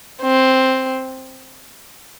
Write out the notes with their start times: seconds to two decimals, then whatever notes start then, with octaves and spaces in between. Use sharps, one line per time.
0.22 C4